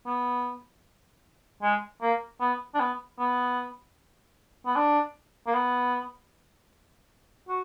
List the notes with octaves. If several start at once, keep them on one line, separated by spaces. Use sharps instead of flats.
B3
G#3
A#3
B3
D4
B3
B3
B3
D4
A#3
B3
F#4